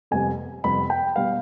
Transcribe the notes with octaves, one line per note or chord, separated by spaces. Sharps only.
F2 C3 G3 B3 G#5
F2 C3 G3 B3 B5
G5
B2 G3 B3 F5